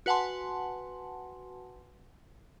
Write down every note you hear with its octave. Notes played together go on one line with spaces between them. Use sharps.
F#4 B4 F#5 G#5 A5 C6